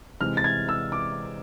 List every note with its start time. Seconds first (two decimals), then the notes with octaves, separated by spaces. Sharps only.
0.20 C3 E3 G#3 F6
0.37 A6
0.44 G#6
0.69 E6
0.92 D6